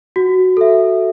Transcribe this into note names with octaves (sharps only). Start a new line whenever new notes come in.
F#4
A4 E5